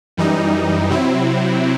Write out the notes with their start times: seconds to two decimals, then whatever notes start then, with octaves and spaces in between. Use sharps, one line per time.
0.17 F#2 E3 G3 D#4
0.90 C3 F#3 C4 E4